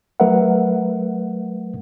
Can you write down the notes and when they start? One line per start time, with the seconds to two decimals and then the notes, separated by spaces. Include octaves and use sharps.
0.20 F#3 A3 A#4 B4 E5 F#5